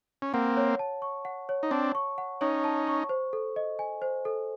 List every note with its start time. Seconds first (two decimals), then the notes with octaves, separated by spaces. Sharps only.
0.22 C#4
0.34 A#3 C4 F#5
0.57 C#5
0.79 A5
1.02 C#6
1.25 F#5
1.49 C#5
1.63 D#4
1.71 C4 D4 A5
1.95 C#6
2.18 F#5
2.41 C#4 D#4 C#5
2.64 A5
2.88 C#6
3.09 C5
3.33 A4
3.56 D#5
3.79 G#5
4.02 C5
4.25 A4